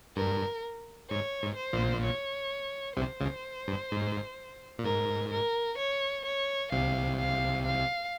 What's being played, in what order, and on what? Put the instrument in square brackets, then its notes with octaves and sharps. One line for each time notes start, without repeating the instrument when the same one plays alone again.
[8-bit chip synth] G2 [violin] A#4
[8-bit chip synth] G#2 [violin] C#5
[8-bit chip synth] G#2
[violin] C5
[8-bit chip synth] A#1 A#2
[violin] C#5
[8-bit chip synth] C2 C3 [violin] C5
[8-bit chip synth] C#2 C#3
G2
G#2
A#2
[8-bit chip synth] G#2 [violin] A#4
[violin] A#4
C#5
C#5
[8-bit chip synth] C2 C3 [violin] F5
[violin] F5
F5